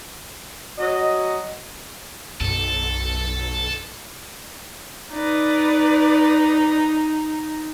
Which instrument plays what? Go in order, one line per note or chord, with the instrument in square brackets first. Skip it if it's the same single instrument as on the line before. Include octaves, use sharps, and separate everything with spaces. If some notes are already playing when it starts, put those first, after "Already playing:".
[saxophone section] F#3 D#5
[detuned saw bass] B1 [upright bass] F#2 [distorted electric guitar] A4
[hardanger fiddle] D#4 [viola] B4 D5